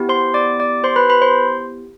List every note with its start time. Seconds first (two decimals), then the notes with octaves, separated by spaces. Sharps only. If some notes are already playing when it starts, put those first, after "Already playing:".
Already playing: B3 E4 G4
0.09 C5 C6
0.34 D5 D6
0.60 D5 D6
0.84 C5 C6
0.96 B4 B5
1.09 B4 B5
1.22 C5 C6